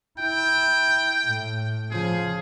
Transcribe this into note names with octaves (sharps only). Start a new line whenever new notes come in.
E4 G5
A2
C#3 F3 G#4